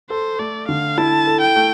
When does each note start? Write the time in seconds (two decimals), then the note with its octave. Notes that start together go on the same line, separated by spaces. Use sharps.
0.10 A4 C5
0.39 A3 D5
0.68 D3 F5
0.98 E4 A5
1.27 A4
1.41 G5
1.56 A3